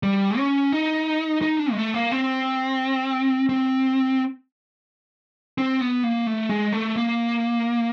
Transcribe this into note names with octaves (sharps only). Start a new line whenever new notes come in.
G3
C#4
D#4
D#4
D4
G#3
A3
A#3
C4
C4
C4
B3
A#3
A3
G#3
A3
A#3